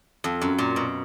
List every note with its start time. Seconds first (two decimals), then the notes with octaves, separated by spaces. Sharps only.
0.24 F2
0.41 F#2
0.58 A#2
0.76 B2